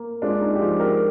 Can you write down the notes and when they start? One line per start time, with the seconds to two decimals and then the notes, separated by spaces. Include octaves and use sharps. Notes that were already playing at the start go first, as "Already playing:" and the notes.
Already playing: A#3
0.22 G#3 D4 F4
0.41 D#4
0.55 G4
0.60 F3 F4 G#4
0.79 G4 A#4